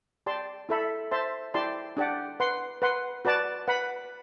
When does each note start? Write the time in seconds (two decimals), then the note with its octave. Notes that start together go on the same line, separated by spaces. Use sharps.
0.26 G4 D5 A5 C6
0.69 E4 A4 E5 B5
1.11 C5 E5 A5 C6
1.54 E4 G4 D5 A5 C6
1.97 D4 G4 D5 F#5
2.40 B4 F#5 C6
2.82 B4 F#5 C6
3.25 F#4 B4 D5 A5
3.68 B4 F#5 B5